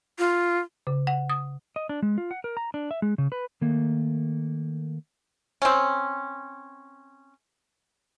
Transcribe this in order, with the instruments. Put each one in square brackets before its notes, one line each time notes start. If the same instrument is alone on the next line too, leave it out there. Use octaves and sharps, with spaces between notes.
[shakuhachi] F4
[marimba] C#3
F#5
D#6
[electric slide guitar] D#5
D4
G#3
F4
F#5
A#4
A#5
D4
E5
G#3
C#3
B4
D#3 A3 A#3
[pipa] C4 C#4